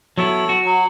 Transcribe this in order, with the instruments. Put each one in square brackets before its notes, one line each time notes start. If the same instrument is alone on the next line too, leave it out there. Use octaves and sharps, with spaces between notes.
[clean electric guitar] F#3 B3 E4 [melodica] A4 C#5
[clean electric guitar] F#4
[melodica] F#3